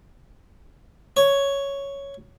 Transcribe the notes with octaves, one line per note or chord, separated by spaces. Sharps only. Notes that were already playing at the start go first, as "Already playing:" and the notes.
C#5